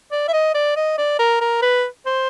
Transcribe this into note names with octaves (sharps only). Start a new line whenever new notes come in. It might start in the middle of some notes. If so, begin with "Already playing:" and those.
D5
E5
D#5
D5
D#5
D5
A#4
A#4
B4
C5